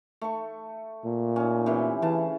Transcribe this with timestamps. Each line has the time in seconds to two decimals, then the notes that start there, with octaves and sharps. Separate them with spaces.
0.21 A3 C#6
1.05 A#2
1.36 C#4 D#4
1.66 C3 E3 C#4
2.02 C#3 E3 A5